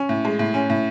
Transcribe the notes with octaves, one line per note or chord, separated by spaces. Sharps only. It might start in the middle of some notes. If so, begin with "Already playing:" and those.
Already playing: C#4
A2
G#3
A2
C#4
A2